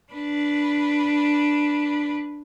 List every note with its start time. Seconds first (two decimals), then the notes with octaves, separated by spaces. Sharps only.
0.12 D4 B4